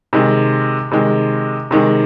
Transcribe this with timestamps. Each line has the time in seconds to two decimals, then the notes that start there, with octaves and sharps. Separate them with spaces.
0.13 C3 D#3 G#3
0.91 C3 D#3 G#3
1.71 C3 D#3 G#3